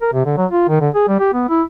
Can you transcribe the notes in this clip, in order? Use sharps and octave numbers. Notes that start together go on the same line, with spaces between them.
A#4
C3
D3
F#3
F4
D#3
D3
G#4
G3
G4
B3
E4